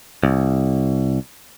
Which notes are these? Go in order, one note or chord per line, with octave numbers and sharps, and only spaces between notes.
C2